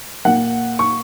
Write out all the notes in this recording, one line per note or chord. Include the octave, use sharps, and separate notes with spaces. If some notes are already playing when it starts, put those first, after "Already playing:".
A#2 A#3 F#5
C#6